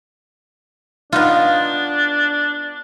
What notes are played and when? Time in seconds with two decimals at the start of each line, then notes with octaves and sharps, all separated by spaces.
1.12 B3 D4 D#4 F4